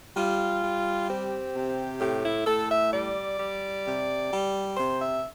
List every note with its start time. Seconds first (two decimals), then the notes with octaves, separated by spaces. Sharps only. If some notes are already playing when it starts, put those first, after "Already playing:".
0.16 G3 F4
0.62 G3
1.09 C4 G4
1.55 C3
2.01 A2 G4
2.24 E4
2.46 A2 A4
2.70 E5
2.93 G3 D5
3.39 G3
3.86 C3
4.32 G3
4.77 C3 C5
5.00 E5